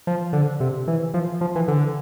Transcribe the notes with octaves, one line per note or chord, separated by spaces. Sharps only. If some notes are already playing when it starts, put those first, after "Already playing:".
F3
D3
C3
E3
F3
F3
E3
D3